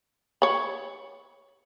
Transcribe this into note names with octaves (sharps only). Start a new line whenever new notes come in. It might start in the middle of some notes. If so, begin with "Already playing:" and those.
C#5 B5